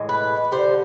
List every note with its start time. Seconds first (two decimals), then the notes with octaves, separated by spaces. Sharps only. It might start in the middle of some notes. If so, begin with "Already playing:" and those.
Already playing: A2 E3 G#3
0.09 B4
0.52 D3 G3 C5